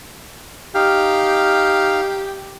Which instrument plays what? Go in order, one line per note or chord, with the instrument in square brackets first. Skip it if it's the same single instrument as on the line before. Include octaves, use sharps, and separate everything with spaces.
[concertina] D#4 F5 F6 [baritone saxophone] G4